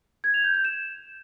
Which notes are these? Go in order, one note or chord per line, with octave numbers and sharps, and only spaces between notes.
G#6
F7
G6
G6
E7